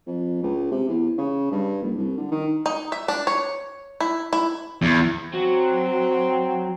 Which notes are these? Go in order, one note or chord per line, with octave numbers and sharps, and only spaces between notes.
F2
C#2
C3
E2
C#3
G2
F#1
C2
D3
D#3
D#4
E5
D4
C#5
E4
E4
E2
F#3 C4